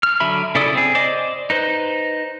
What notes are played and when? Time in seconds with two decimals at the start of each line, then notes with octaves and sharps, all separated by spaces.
0.03 F6
0.20 D3 F#3 E5 B5
0.55 C#3 E4 A4 D5 D#6
0.75 C4 G#4
0.95 C5 D5 D#5 D6
1.50 D#4 B4 C5